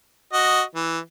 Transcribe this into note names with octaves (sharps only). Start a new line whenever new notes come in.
F#4 D#5
E3